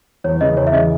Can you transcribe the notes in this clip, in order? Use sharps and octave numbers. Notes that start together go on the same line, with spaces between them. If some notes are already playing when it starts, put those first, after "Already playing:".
E2 C#5
C#3 E3 D#5
E2 C#5
E5
C#3 E3 D#5